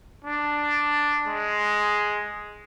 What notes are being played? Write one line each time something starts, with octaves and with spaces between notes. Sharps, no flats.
D4
G#3